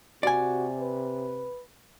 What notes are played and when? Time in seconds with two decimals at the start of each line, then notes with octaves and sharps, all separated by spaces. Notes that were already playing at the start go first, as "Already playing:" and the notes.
0.23 C3 F#4 D5 G#5
0.80 B4